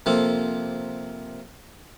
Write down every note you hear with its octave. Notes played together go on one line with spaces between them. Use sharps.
C3 F3 A#3 A4